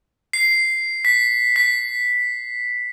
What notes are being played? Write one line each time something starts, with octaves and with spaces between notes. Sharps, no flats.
C7
B6
B6